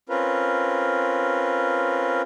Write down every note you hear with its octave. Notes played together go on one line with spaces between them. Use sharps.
C4 C#4 F4 A#4 B4